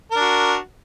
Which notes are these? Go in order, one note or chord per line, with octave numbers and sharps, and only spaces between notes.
D4 F#4 A#4